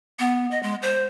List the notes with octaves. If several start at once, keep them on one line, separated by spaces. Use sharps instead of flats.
B3
D#5
G#3
C5